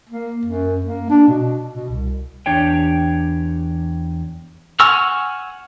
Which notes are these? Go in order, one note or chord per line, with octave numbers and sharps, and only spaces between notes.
A#3
F#2
A#3
D4
B2
B2
C2
E2 D4 G4 C#5 G5
F#5 G#5 C#6 E6 F6